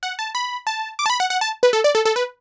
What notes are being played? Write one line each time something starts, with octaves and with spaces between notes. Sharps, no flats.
F#5
A5
B5
A5
D6
A5
B5
F#5
F#5
A5
B4
A4
D5
A4
A4
B4